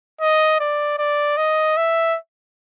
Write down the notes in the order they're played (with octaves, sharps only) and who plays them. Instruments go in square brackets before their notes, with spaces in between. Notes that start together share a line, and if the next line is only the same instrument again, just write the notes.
[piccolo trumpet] D#5
D5
D5
D#5
E5